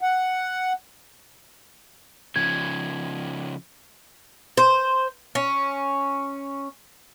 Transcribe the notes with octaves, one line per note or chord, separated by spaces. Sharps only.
F#5
C#3 F3 G#6
C5
C#4